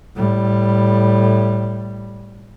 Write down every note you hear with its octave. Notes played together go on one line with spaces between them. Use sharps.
A2 G3